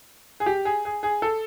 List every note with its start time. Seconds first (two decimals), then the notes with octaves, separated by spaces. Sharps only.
0.40 G#4
0.46 G4
0.65 G#4
0.85 G#4
1.03 G#4
1.22 A4